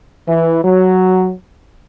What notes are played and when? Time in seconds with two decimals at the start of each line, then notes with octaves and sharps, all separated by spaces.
0.27 E3
0.64 F#3